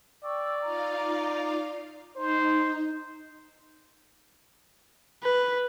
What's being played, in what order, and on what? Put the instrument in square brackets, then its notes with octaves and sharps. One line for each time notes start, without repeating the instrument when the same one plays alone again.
[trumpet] D5 [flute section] G5 C#6 E6
[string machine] D#4 F4 F5 [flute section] A#5
[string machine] D#4 [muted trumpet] C5
[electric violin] B4